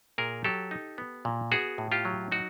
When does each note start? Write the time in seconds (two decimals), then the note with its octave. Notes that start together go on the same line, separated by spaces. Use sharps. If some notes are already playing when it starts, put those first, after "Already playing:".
0.18 A#2 G#4 A#4
0.44 F#3 G4 A4
0.71 D#4
0.98 B3
1.25 A#2
1.52 B3 F#4 G#4
1.78 A2
1.92 F4 G4
2.05 F#3
2.32 D#4 F#4